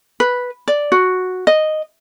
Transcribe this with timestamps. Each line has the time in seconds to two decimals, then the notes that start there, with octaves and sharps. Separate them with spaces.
0.20 B4
0.68 D5
0.92 F#4
1.47 D#5